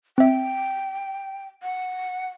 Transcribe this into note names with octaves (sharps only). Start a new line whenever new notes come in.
C4 E5 G5
F#5